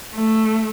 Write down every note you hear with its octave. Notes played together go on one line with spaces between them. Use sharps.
A3